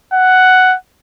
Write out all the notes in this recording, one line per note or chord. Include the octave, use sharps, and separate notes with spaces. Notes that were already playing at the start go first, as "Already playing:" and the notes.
F#5